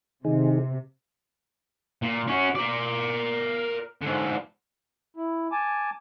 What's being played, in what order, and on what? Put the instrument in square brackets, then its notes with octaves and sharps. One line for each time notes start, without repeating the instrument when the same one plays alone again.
[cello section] C3 [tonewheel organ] D#3 D#4 G#4
[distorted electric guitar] A#2
C#4 F#4
A#4 D5
G#2 D3
[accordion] E4
G#5 A5 D6